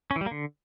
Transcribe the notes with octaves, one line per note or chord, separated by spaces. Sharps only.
C#4
E3
G3
A#3
D3